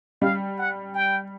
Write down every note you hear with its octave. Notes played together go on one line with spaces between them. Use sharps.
G3 F5
F#5
G5